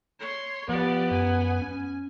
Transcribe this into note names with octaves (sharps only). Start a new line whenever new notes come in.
C#5 C6
F3 B3 G4 D5
F#2 G#5
C#4